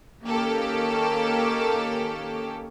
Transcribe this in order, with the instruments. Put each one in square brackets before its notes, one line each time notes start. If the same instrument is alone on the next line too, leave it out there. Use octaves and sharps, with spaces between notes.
[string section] D#3 A#3 C#4 G4 A4